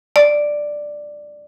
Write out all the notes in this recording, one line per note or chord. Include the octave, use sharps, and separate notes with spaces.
D5